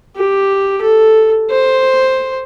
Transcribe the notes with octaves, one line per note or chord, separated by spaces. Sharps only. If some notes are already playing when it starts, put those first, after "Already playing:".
G4
A4
C5